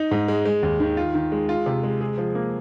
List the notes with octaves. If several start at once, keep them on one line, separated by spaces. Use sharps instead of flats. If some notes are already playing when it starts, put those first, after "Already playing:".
Already playing: D#4
G#2
G#3
G#3
D#2
D#3
F4
D#3
G#3
F4
C3
G#3
G#4
F3
A#3